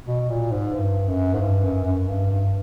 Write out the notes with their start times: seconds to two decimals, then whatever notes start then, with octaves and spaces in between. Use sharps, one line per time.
0.07 B2
0.30 A#2
0.52 G#2
0.74 G2
1.08 F#2
1.33 G#2
1.41 G2
1.64 F#2
1.85 F#2
2.08 G2
2.30 G2